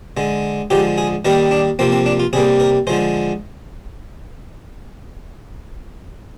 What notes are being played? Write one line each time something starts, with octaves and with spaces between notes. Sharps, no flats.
D3 G#3
D3 F3 G#3 G4
G#4
D#3 G3 A#3 A#4
D4
C3 F3 A#3 C4
C4
D4
F4
C3 G3 A#3 G#4
A#4
D3 F3 G#3 C5